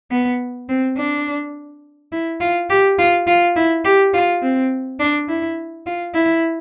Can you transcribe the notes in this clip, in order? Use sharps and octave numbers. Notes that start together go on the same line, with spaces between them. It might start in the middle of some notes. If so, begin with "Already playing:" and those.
B3
C4
D4
E4
F4
G4
F4
F4
E4
G4
F4
C4
D4
E4
F4
E4